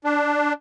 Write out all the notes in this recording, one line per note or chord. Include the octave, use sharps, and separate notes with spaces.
D4